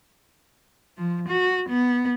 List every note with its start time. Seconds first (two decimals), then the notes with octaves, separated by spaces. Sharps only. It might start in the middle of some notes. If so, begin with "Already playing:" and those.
0.98 F3
1.29 F#4
1.69 B3